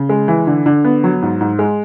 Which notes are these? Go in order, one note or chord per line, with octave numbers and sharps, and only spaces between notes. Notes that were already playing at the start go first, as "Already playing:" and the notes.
Already playing: C#3
G#3
E3
D3
D3
B3
F#3
G#2
G#2
G#3